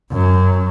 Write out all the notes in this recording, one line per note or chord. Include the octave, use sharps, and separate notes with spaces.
F#2